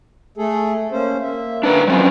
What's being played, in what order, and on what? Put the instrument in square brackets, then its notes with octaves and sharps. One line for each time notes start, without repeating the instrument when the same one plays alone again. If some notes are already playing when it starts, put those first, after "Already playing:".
[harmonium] A3 G#4 A4
A#3 C#4 C5
A#3 E5
[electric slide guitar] D4 B4 A#5
[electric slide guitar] F#3 C4 C#4 [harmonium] F4